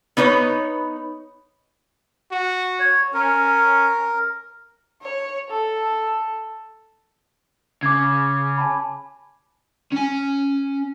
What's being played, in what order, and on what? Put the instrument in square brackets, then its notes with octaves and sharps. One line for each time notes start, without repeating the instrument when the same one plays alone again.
[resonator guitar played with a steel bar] B3 D#4 B4 C#5
[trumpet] F#4
[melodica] C#5
[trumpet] C#4 [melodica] A#4
[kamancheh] C#5
A4
[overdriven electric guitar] C#3 [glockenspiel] D6 G#6
[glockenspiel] G#5 A5 B5
[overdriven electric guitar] C#4 G#5